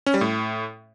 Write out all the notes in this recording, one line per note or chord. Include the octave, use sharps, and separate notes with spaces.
C#4
G3
A2